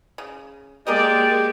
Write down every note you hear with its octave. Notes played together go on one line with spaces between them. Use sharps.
C#3
G#3 A#3 G4 G#4 A#4 D5 D#5 G5